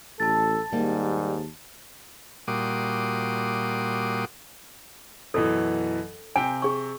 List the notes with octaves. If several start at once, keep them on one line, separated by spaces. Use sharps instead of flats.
A1 A4 A5 A6
D#2 G#2 G3 A#3
A#2 G3 F#4 C6 D6 D#6
F#2 B2 E3 A4
C3 G5 G#5
G#4 C#6